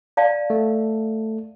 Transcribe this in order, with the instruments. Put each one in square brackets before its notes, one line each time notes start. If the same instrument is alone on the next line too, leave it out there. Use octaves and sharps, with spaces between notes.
[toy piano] D5 F5 A5
[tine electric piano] A3